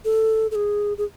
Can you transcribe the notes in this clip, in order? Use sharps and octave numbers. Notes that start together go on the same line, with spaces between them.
A4
A4
G#4
G#4